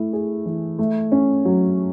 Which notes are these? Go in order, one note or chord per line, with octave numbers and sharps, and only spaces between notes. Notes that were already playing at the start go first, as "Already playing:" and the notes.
Already playing: A3 E4
G#4
E3
A3
C#4
F#3